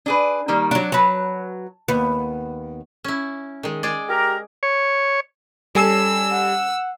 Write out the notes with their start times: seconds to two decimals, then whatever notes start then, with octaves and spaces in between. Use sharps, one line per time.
0.06 D4 G#4 B4
0.48 D#3 G3 A#3
0.71 F#3 D4
0.92 F#3 B4 A5
1.88 D#2 B3
3.04 C#4 E4
3.63 D#3 G#3
3.83 G#3 G#4 D5
4.09 G4 A#4
4.63 C#5
5.75 G3 C#4 A4 G#5 E6 C7
6.32 F#5